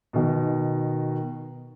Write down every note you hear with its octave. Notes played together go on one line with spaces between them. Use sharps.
B2 D#3